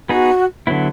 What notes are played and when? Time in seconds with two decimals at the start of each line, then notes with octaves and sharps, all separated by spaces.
0.09 B3 D#4 F#4 G#4
0.67 D3 F#3 B3 E4